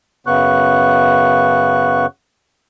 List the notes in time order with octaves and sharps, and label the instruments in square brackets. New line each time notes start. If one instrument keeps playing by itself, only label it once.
[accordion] F#2 C#3 B3 C#6 F#6